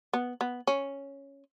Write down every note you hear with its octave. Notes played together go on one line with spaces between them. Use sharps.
B3
B3
C#4